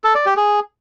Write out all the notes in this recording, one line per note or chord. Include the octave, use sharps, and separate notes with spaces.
A4
D5
G4
G#4